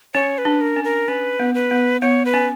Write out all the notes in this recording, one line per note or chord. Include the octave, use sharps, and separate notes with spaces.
C#4 C#5
B4
D4
A#4
C#4
A#4
C#4 B4
B3
B4
B3
B3 C#5
B4
C#4